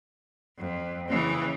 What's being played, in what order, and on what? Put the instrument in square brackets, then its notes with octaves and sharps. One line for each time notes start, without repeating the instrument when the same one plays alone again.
[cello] F2
C#3 E3